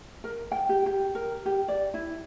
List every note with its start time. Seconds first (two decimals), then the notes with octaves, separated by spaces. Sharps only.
0.24 A#4
0.52 G5
0.69 G4
0.86 G4
1.15 A#4
1.46 G4
1.68 D5
1.94 E4